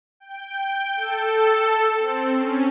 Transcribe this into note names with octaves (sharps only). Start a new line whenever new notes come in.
G5
A4
C4
C#4